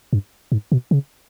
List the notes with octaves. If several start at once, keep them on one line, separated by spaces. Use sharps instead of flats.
G2
G#2
B2
C#3